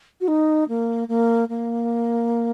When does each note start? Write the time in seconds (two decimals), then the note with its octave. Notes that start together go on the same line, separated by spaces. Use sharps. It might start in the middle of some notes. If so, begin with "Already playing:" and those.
0.21 F#4
0.28 D#4
0.69 A#3
1.08 A#3
1.49 A#3